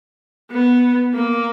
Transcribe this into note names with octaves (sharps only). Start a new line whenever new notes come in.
B3
A#3